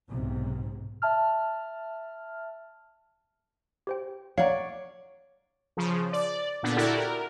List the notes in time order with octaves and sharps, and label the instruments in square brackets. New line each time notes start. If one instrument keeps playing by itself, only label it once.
[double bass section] B1 G#2 C3
[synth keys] E5 A5 F6
[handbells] G4 C5 G5
[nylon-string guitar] C#5 D5 [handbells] F5 F#5 A#5
[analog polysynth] C#3 F3
D5
A#2 D3 B3 D4
E4 F#4 G4 A4 A#4 D5
A#4